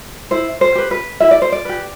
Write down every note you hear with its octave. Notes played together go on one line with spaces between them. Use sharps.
E4 C5
C5
G4 B4
B4
E4 E5
D5
C5
D5
G4 B4